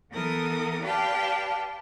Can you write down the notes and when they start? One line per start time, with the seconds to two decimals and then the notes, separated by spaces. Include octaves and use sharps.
0.12 E3 B3 A4 A#4 D#6
0.82 G4 B4 D5 F5 G5 A5